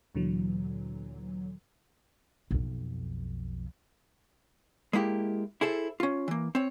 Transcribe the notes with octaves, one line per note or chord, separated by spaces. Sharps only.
D2 A#2 D3 E3 F#3
B1 F2
G#3 A#3 E4 G4
E4 G#4 A4 C5
C#4 F4
E3 A#3
C4 C#5